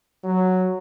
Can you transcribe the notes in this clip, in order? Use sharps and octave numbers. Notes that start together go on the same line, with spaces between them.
F#3